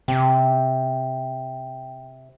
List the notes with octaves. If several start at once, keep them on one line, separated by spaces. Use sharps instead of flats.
C3 G5